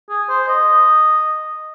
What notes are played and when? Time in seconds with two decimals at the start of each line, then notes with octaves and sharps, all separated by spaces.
0.09 G#4
0.29 C5
0.48 D#5